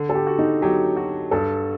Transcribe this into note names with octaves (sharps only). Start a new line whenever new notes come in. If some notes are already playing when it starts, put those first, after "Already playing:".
Already playing: D3
A4
G4
F#4
D#4
F#3 G4
F#4
G2 A4